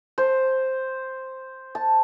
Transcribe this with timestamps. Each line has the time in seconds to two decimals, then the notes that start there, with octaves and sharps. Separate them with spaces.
0.18 C5
1.75 A5